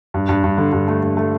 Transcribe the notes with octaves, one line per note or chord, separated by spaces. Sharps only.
G2
G2
G2
D3
G2
A3
G2
A3